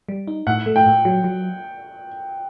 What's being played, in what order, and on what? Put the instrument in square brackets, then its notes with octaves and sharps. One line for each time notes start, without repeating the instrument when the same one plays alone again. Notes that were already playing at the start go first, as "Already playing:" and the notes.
[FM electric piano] G3
D#4
[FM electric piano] A2 [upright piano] F#5
[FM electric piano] A3
[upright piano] G5
[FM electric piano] A2
F#3
F#3